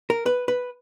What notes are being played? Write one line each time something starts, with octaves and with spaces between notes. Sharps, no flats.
A#4
B4
B4